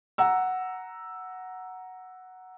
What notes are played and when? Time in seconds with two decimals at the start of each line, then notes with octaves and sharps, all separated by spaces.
0.18 F#5 A#5 E6